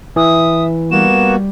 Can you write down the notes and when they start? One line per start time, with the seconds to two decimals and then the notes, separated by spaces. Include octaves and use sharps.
0.16 E3 E5 D#6
0.91 G3 A#3 B3 F#4 E7